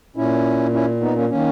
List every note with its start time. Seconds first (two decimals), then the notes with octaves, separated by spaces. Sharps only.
0.16 A#2 C#4 E4
0.73 C#4 E4
1.01 B3 D#4
1.15 A#3 C#4
1.29 D#3 A#3 C#4